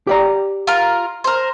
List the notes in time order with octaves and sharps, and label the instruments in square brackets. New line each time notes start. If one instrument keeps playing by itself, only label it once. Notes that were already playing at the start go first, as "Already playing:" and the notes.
[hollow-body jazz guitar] G4 D5 A#5
[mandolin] F4 A#4
A#4 C5